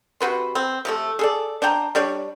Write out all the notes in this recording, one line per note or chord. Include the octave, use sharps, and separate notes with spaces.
C3 F#4 B4 C6
C4
C3 F3 A3
G#4 A4 D5
D4 C5 G5 A#5
G3 D4 C#5 D5